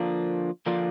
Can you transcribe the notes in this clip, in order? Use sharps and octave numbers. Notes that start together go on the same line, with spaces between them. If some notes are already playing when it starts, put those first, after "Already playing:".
Already playing: D3 F3 A#3 D4 F4
D3 F3 A#3 D4 F4